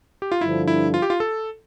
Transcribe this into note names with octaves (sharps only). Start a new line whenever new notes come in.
G4
F4
G2 D3 F3 E4
E4
F4
G4
F4
A4